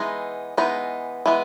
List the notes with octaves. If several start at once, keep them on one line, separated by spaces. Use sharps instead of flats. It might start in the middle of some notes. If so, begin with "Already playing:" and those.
Already playing: E3 G#3 B3 D#4
E3 G#3 B3 D#4
E3 G#3 B3